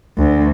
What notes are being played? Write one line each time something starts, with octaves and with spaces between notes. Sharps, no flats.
D2